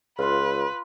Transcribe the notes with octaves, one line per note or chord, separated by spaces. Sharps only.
C#2 F4 B4 C6